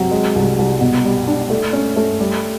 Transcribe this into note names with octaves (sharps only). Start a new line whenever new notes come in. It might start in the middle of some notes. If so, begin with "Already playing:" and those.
Already playing: C3 F#3
G#3
C2
C2
B2
G3
D4
A3
C#4
A3
G3